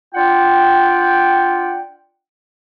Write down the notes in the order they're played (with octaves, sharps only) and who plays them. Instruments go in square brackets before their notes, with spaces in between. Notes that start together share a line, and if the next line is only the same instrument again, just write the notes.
[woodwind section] D4 F4 F#5 G5